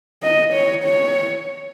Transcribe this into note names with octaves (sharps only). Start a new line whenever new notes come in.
D#5
C#5
C#5